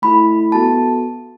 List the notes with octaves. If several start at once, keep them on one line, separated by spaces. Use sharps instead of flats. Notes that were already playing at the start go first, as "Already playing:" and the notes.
A3 E4 A4 B5
B3 F#4 A4 A5